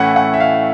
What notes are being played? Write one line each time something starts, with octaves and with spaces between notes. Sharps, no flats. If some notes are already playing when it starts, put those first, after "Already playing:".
Already playing: A2 E3 A3 C#4 E4 F#5
F#5
E5
F5